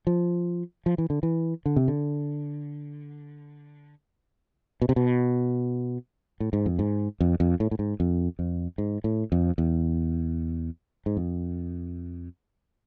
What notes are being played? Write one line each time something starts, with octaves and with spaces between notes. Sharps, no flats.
F3
F3
E3
D3
E3
D3
C3
D3
B2
C3
B2
A2
G#2
F2
G#2
F2
F2
A2
A2
G#2
F2
F2
G#2
A2
F2
E2
G#2
F2